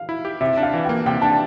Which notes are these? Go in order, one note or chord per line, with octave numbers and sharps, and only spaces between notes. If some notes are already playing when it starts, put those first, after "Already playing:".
Already playing: F5
E4
G4
C3 E5
D4
F5
E3
A#3 G5
C3 G5
D4 A5